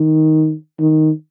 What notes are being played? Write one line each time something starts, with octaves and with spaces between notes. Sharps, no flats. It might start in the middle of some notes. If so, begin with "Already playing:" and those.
Already playing: D#3
D#3